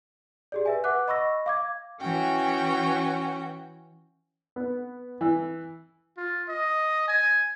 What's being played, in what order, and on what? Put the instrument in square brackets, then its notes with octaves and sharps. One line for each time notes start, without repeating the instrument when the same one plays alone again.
[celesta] G4 G#4 D5
B4 E5 G#5
B4 F#5 D6 F#6
D#5 B5 C#6 E6 A#6
F5 D6 G#6
[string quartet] E3 C#4 F#4 G5
[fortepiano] B3
E3
[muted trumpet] F4
D#5
G#5